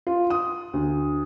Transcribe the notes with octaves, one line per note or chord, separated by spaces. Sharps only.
F4
D#6
D2